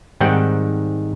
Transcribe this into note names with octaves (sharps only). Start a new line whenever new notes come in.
G#2 D#3 G3 C4 F#5 G5